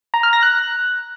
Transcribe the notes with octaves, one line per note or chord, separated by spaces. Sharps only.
A#5
F6
A#6
F#6